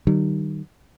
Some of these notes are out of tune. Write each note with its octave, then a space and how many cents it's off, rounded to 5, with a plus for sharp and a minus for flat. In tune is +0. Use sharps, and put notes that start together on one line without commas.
D#3 -30 G3 -40